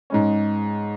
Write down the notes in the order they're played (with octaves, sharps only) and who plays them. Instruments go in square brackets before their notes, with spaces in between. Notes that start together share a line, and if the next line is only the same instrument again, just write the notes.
[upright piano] G#2 G#3 C#4